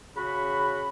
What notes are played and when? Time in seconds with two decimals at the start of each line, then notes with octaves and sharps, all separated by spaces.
0.16 C#3 F#4 B5